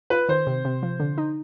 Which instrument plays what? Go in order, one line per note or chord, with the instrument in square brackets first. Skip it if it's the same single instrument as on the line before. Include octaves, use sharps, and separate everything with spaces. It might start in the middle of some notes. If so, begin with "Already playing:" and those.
[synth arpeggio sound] F4 [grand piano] B4
[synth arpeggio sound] D#3 [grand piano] C5
[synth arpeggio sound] C3
C3
F3
D3
D#4